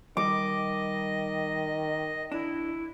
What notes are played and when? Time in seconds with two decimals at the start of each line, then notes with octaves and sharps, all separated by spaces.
0.17 D#3 G3 D#5 D6
2.32 D4 E4